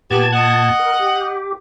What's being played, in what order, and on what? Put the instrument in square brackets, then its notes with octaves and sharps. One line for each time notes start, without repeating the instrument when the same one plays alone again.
[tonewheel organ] A#2 A5 G#6 [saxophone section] B3 G4
[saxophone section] D#5 F#5
[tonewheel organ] A#4
G4